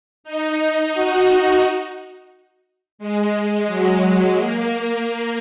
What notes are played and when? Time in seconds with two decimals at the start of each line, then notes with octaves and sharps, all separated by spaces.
0.24 D#4
0.93 F#4
2.99 G#3
3.67 F#3
4.01 G#3
4.36 A#3
5.05 A#3